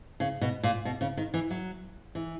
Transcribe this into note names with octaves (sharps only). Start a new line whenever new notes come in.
C#3
B2
A#2
B2
C#3
D#3
E3
F#3
E3